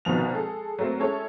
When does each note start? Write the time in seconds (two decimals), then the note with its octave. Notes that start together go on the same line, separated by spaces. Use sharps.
0.05 C2 B2 D#3 F3 F7
0.35 G#3 G#4 A4
0.79 F#3 A3 A#3 C4
0.99 G#3 C#4 E4 A4 C#5